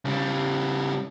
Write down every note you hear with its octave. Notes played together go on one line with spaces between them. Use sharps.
C#3 G3